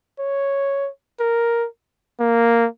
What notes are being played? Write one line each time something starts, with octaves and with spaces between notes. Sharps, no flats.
C#5
A#4
A#3